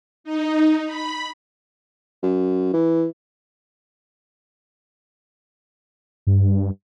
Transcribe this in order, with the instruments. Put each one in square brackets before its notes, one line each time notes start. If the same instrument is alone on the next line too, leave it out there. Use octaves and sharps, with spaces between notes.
[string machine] D#4
B5
[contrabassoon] F#2
E3
[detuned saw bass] G2